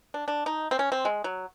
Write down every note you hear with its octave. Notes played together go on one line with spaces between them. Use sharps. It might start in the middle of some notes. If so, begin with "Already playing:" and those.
D4
D4
D#4
C4
C#4
C4
G#3
F#3